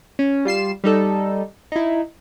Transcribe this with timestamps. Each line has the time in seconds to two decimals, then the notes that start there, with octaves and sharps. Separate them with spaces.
0.19 C#4
0.45 G3 F4 C7 E7
0.84 G3 D#4 A4
1.72 D#4 E4